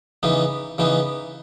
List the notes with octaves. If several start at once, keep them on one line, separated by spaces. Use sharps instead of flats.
C#3 E3 B3 D#4
C#3 E3 B3 D#4